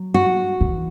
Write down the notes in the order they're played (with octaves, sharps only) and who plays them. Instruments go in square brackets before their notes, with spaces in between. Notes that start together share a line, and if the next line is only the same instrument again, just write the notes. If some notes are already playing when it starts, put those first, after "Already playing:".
Already playing: [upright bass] F#3
[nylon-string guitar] F#4
[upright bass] E3